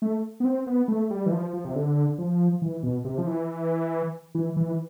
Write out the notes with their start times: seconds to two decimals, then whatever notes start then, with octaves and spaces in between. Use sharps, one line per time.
0.02 A3
0.40 B3
0.45 C4
0.67 B3
0.88 A3
1.10 G3
1.26 E3
1.32 F3
1.53 F3
1.65 C3
1.75 D3
2.18 F3
2.62 E3
2.83 B2
3.05 C3
3.18 F3
3.27 E3
4.35 E3
4.57 E3